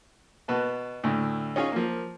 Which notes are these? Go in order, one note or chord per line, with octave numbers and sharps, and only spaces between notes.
B2 B4 A5
D2 A2
C#4 D#4 F4 G#4 C#5
F3 A#3